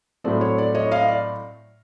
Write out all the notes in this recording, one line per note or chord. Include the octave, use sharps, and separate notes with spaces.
A2 F#3 A3 C4 D5
C#5
D5
C#5 D#5
D#5 F5
D5